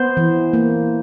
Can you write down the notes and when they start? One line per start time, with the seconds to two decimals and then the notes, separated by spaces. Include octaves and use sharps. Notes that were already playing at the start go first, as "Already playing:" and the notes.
Already playing: B3 C5
0.17 E3
0.53 A#3